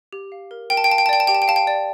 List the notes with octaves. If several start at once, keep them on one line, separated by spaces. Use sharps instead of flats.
G4
F5
A#4
A#4 G5
A5
G5
F5 A5
G5
A5
D5 G5
A5
G4 G5
A5
G5
F5 A5
G5
D5